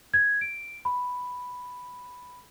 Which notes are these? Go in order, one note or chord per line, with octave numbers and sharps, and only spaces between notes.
G#6
D7
B5